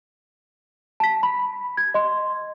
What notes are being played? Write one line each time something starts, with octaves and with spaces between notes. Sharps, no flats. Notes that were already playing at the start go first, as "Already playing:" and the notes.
A5 B6
B5
G#6
D#5 C6